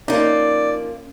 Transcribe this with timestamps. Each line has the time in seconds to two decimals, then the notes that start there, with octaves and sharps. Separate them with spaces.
0.08 F3 A#3 C#4 D#4 D5